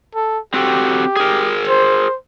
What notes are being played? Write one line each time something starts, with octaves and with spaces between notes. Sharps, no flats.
A4
C4 F#4 G4 A4
G#4 A#4
C5